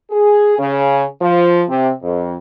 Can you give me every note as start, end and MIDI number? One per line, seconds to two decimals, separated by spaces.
0.10 0.55 68
0.59 1.03 49
1.22 1.63 53
1.68 1.90 48
2.02 2.35 41